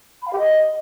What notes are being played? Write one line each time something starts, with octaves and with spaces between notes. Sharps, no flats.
B5
F5
G4
D#5